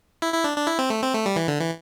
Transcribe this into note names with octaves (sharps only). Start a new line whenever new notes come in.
E4
E4
D4
D4
E4
C4
A3
C4
A3
G3
E3
D3
E3